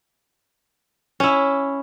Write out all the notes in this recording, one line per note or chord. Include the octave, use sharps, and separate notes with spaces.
C#4 E4